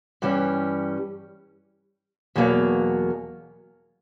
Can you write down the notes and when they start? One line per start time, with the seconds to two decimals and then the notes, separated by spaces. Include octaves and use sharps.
0.22 G2 E3 G3 C#4
2.35 E2 B2 F#3 A#3